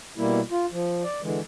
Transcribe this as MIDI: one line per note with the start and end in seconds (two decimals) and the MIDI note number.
0.18 0.40 47
0.18 0.40 55
0.18 0.40 58
0.18 0.40 64
0.51 0.66 65
0.72 1.03 53
1.04 1.21 74
1.22 1.40 50
1.22 1.40 52
1.22 1.40 56